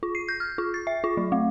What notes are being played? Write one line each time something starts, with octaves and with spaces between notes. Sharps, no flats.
F4
C7
G6
F6
F4
A6
E5
F4
F#3
A3